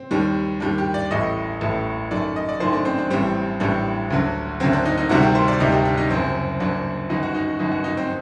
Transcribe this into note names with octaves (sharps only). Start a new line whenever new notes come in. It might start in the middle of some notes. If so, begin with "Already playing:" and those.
Already playing: C4
D#2 D#3 G3
D#2 D#3 G3 D4
G4
D5
A1 A2 A3 D#5
A1 A2 A3
F#2 D#3 A3 D5
D#5
D5
F#2 D#3 A3 C5
D4
C4
D4
A1 A2 G3 C4
A1 A2 G3 D4
D2 D3 F#3
D2 D3 F#3 C4
D4
D#4
D#4
D2 C3 D#3 G3 F#4
G4
C5
D5
D2 C3 D#3 G3 D#5
G4
D4
D#4
F#1 F#2 F#3 C4
F#1 F#2 F#3 D4
G1 F#2 D#3 D#4
F#4
D#4
F#4
G1 F#2 D#3 D#4
F#4
D#4
C4